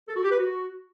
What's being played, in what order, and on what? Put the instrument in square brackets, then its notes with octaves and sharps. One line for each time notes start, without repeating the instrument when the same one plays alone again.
[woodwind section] A4
F#4
G4
B4
F#4